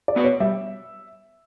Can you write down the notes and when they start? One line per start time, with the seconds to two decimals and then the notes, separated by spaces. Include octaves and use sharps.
0.08 D5
0.16 B3 F#4 B4
0.24 C#5
0.40 G3 E5